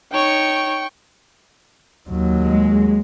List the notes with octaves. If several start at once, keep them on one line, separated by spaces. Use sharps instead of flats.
D#4 C#5 G5 C#6
D#2 F#3
G#3